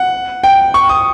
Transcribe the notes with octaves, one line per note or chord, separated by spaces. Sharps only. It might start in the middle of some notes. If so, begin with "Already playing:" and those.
Already playing: F#5
G5
C#6
D#6